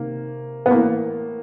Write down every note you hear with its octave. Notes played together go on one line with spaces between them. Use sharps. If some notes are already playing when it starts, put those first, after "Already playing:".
Already playing: C3 D#3 A#3
B3
A2 E3 A#3